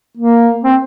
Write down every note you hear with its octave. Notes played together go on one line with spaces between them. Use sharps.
A#3
C4